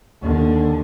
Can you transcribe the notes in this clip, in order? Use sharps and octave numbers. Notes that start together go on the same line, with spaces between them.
D#2 D3